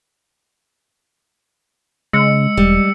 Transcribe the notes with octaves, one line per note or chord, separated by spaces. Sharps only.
C#3 G#3 E6 C#7
E1 G3